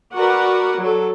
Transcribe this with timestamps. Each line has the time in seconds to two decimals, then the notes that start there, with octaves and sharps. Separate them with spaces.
0.15 F#4 A#4 B4 D5 F#5
0.80 F#3 A4